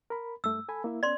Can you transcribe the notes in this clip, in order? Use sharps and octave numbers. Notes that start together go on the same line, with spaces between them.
A#4 B5
G2 A3 E6
A4 G#5 B5
A#3 E4 E5
B3 C#4 D5 C6